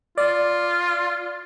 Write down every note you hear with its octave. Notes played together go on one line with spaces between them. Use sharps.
F4 D5